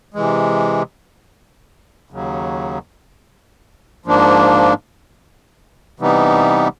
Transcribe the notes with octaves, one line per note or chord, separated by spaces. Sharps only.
C3 E3 G#3
D#2 C#3 F#3
G#2 F3 A#3 D4
C3 E3 G3 B3 D#4